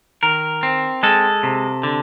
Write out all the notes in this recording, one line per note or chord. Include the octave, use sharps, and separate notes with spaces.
D#3 A#4
C4
G#3 A4
C3
D3